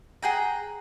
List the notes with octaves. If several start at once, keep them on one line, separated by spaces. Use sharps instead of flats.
G#4 F#5 G5 A#5